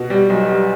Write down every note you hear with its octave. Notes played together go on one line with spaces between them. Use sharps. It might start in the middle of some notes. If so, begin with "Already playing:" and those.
Already playing: B2
G3
B1
G3